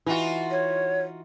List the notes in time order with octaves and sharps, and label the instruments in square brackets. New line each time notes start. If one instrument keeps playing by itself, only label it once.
[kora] E3 [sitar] D#4 F4 F#4
[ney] C#5